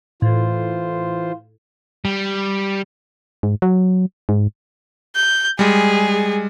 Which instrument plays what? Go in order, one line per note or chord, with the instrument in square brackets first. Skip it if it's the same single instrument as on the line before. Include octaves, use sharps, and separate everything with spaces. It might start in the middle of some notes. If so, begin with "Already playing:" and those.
[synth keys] A2 [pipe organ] E3 F4 C5
[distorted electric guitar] G3
[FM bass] G#2
F#3
G#2
[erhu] G6
[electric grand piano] G3 G#3 [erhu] G#4